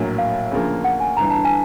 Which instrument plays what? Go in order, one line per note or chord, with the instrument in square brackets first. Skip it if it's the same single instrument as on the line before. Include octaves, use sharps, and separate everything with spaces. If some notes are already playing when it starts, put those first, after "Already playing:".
Already playing: [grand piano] A#1 A2 F#3 A#3
[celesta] F5
[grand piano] D2 C#3 F3 A#3
[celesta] F#5
G#5
[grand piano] G1 G2 E3 [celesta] A#5
[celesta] A5
G#5